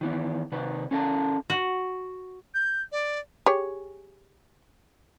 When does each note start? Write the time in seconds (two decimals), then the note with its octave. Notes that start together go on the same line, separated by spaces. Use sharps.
0.01 D#3 E3 B3
0.52 C3 D#3 B4
0.91 C#4 A4 A#4 G#5 A5
1.50 F#4
2.54 G6
2.92 D5
3.46 G4 G#4 C#5